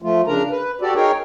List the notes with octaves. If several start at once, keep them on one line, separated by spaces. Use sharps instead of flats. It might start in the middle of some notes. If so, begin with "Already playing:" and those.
F3 A3 F4
C#3 D4 A#4 A#5
B4
F#4 G4 A4 D5
D#4 G#4 A#4 C#5 G5